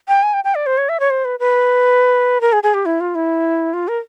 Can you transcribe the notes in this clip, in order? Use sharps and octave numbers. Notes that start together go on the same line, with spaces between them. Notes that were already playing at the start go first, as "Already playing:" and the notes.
G5
G#5
G5
G5
D5
C5
C#5
E5
C#5
C5
B4
B4
A#4
G#4
G#4
G4
E4
F4
E4
F4
A#4